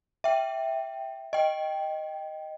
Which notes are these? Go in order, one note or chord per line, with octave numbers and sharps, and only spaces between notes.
E5 G5
D#5 G5